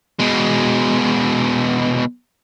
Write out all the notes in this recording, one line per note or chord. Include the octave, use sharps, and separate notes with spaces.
B2 G#3